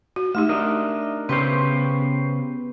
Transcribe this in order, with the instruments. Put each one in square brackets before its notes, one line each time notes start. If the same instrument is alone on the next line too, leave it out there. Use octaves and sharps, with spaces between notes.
[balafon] F#4
[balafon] A3 D#4 G4 [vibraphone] E5
[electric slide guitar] D4 A#4 D#5
[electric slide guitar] C#3 G4 C5 [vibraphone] B3 B4 C#6 [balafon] C6